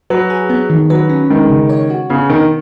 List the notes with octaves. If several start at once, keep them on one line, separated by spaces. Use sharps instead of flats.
F#3 B4
G#4
B3
D#3
F#3 B4
C#4
D#3 G#3
C#3
C#5
F#4
C#3 B3
B2 D#3